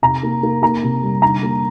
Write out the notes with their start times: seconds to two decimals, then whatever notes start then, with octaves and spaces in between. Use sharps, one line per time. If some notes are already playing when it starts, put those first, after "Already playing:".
0.02 C3 A#5
0.23 A#3
0.43 A#3
0.62 A#3 A#5
0.83 C3
1.03 G3
1.22 D3 A#5
1.43 A#3